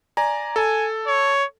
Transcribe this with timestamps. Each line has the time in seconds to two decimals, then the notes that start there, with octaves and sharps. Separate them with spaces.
0.17 D5 G#5 A#5
0.56 A4 G#5
1.07 C#5